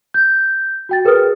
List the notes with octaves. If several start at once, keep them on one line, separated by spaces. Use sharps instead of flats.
G6
F#4 G5 A6
G#4 A#4 B4 D#6 F6